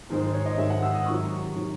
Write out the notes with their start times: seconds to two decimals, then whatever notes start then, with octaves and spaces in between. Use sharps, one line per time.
0.10 G#2 D#3 G#3 C5
0.22 C5
0.34 C#5
0.46 D#5
0.58 G#2 D#3 G#3 E5
0.70 F#5
0.83 E6
0.94 D#6
1.06 C3 D#3 F#3 C#6
1.55 C3 D#3 F#3